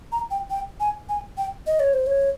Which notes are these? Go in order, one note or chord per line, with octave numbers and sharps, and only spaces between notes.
A#5
G5
G5
G#5
G#5
G5
D#5
C#5
C5
C#5